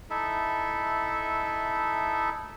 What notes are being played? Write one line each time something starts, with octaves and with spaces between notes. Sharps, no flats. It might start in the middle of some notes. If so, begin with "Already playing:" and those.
D#4 E4 A4 E5